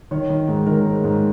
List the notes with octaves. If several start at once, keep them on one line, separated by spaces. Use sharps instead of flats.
D#3 C#5
D#3
G#2
D#3 A#4
G#2
G#2